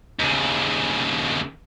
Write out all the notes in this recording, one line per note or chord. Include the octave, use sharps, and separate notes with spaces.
D#2 C#3